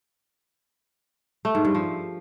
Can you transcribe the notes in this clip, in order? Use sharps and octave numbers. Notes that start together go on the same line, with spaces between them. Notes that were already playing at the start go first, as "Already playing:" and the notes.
A3
G#2
G2
F3